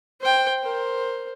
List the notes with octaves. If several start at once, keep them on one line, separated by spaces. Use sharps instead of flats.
C5 G5
A#4 C5